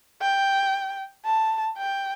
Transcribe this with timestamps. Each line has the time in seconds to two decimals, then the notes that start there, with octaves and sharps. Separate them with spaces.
0.22 G5
1.25 A5
1.77 G5